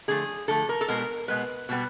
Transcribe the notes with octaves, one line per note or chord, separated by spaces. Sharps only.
D3 F3 A3 G#4
D3 F3 A3 A4
A#4
A4
B2 G#3 B3 A#4
B2 G#3 B3 B4
B2 G3 B3